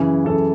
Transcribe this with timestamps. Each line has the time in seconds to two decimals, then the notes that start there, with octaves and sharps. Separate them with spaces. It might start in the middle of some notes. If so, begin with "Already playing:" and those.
Already playing: F#2 C#3 E3
0.25 F#2 C#3 E3 A4